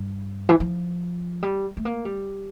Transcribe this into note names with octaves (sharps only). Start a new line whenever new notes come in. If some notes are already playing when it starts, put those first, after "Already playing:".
Already playing: G2
E3
F3
G3
A3
A#3
G3